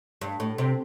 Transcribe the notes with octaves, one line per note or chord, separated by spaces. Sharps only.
G2
A2
C3